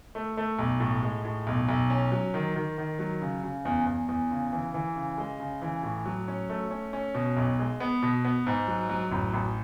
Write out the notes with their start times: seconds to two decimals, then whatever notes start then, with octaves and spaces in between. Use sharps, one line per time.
0.15 A3
0.37 A3
0.59 B1
0.80 A2
1.03 G#3
1.25 A2
1.47 B1
1.69 B1
1.90 C#4
2.12 F#3
2.34 D#3
2.55 D#3
2.78 D#3
2.99 F#3
3.22 C#3
3.43 C#3
3.65 E2
3.86 E2
4.08 E2
4.31 C#3
4.53 E3
4.74 E3
4.96 C#3
5.18 G#3
5.40 C#3
5.62 E3
5.83 A2
6.06 F#3
6.28 C#4
6.49 A3
6.71 C#4
6.93 C#4
7.14 B2
7.37 B1
7.59 G#3
7.80 B3
8.03 B2
8.25 B3
8.47 G#2
8.68 F#3
8.89 F#3
9.12 A1
9.34 A1